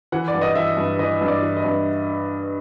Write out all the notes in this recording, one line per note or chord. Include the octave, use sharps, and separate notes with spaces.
E3 F#5
D5
G2
D#5
E3 E5
G2
E3 D#5
G2
D5
E3
D#5
G2